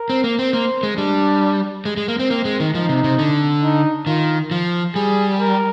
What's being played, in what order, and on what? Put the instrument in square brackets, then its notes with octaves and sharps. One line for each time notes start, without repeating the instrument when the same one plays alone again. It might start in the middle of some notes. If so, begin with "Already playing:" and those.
Already playing: [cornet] A#4
[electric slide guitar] C4
A#3
C4
[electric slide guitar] A#3 [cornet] C5
[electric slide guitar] G#3
[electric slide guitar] G3 [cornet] D4
[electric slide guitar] G#3
G#3
A#3
C4
[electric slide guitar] A#3 [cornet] C4
[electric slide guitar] G#3
D#3
[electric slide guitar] F3 [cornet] D#4
[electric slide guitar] C3
C3
D3
[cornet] D#4
[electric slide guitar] D#3 [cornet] F4
[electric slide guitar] F3
[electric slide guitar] G3 [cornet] G#4
[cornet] A#4